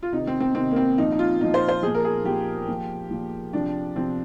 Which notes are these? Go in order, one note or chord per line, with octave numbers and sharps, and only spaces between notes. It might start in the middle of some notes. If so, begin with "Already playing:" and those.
F4
C3 D#3 D#4
C4
C4
C3 D#3 C4
A#3
C4
A#2 F3 D#4
D#4
F4
A#2 F3 D#4
C5
C5
A#2 F3 G#4
A#4
G#4
A#2 F3 G4
A#2 F3
A#2 F3
C3 F3 D4
C3 F3 C4